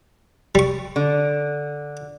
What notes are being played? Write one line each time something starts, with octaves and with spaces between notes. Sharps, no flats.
G3 C#6
D3